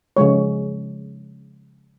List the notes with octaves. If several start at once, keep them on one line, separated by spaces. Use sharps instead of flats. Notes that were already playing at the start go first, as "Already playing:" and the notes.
C#3 F3 G#3 C#5